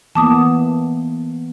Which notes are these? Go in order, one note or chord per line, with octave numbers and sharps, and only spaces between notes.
E3 A#3 B3 A5 D6 D#6